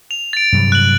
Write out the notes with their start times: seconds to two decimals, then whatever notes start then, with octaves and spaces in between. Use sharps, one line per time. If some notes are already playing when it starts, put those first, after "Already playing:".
0.11 F7
0.33 A6 D7
0.53 G2 C3 F#3
0.72 F#6 F#7